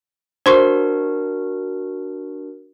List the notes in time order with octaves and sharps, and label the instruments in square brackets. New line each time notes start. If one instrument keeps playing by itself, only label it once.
[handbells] D4 F#4 A#4 [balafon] C5 C6 C#6